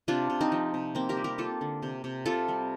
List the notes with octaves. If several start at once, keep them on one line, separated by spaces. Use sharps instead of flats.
C3 D4 F4
C3
C4 D#4
F3
C3
A#3 C4
G4 A#4
G3
G4 A#4
A#3 F4 A4
D3
C3
C3
C3 F4 A4
G3